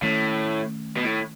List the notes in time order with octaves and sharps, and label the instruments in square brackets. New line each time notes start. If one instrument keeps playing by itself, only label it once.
[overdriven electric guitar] A2 [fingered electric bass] D#3 A3 C#4
[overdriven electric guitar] B2
A2